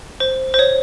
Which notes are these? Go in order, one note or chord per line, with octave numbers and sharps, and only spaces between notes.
C5
C5
C#5